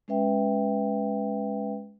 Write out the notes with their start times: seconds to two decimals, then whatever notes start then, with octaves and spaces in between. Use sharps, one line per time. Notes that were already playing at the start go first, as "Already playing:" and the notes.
0.08 G#3 C#4 B4 E5 G5